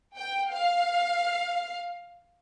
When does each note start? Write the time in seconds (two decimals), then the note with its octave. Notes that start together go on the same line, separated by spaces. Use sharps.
0.16 G5
0.51 F5